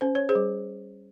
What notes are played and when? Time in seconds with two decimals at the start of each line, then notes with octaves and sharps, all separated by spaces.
0.01 C#4 C5
0.15 C#5
0.29 G#4 C5
0.35 G3